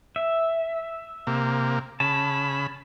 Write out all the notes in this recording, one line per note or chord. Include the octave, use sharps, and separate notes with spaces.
E5
C3 A#3
C#3 A5 B5